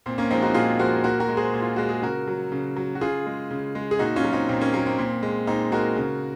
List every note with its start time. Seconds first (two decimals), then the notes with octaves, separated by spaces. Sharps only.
0.06 A#2 C4
0.18 A#3 C#4
0.30 F3 G#3 C4 D#4
0.42 D#4 F#4
0.54 A#2 F4 G#4
0.79 F3 G#3 F#4 A#4
1.04 A#2 F#4 A#4
1.20 F#4 A#4
1.28 G#3
1.37 G#4 C5
1.53 A#2
1.62 F4
1.76 G#3 F#4
1.89 G#4
2.03 C#3 F#4 A#4
2.28 F#3
2.52 C#3
2.76 F#3
2.95 F#4
3.01 C#3 F4 G#4
3.26 G#3
3.51 C#3
3.75 G#3
3.91 G#4
3.99 A#2 D#4 F#4
4.16 C#4 F4
4.24 F#3
4.33 C4 D#4
4.49 A#2 C4
4.61 A#3 C#4
4.74 F#3 A#3
4.86 C4
4.98 A#2
5.23 G#3
5.47 A#2 C4 D#4
5.72 G#3 F#4 A#4
5.97 C#3